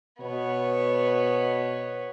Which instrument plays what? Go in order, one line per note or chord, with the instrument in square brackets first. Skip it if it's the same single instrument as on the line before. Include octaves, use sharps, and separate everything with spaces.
[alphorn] B2 [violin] B3 C#5